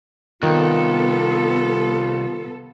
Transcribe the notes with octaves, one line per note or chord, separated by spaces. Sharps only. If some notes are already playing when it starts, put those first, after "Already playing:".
C2 D#3 B3 F4 A4